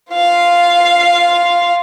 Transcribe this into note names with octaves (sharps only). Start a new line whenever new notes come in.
F4 F5